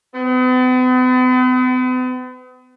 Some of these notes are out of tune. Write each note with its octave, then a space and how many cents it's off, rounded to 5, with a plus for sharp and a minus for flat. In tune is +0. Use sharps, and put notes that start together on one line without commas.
B3 +45